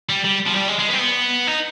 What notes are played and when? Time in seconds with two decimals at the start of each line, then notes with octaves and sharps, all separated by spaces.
0.09 G3
0.24 G3
0.47 F3
0.54 G3
0.68 G#3
0.79 G#3
0.89 B3
0.94 C4
0.99 B3
1.47 D#4